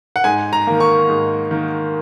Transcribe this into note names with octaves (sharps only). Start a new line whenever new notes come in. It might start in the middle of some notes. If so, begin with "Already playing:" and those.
F#5
G#2 G#5
A#5
D#3 A#3
C#6
G#2
D#3 A#3